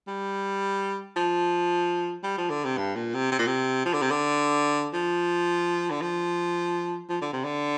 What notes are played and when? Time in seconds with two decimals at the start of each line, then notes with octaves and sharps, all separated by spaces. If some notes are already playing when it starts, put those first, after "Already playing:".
0.07 G3
1.16 F3
2.23 G3
2.38 F3
2.50 D3
2.64 C3
2.77 G2
2.95 A#2
3.14 C3
3.32 C3
3.39 A#2
3.47 C3
3.85 F3
3.93 D3
4.02 C3
4.10 D3
4.93 F3
5.90 D3
6.01 F3
7.09 F3
7.21 D3
7.33 C3
7.44 D3